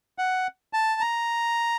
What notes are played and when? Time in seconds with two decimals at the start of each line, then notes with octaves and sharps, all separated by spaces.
0.18 F#5
0.73 A5
1.01 A#5